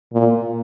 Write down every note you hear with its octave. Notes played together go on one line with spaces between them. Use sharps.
A#2